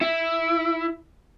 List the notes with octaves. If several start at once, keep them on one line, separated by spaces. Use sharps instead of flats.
E4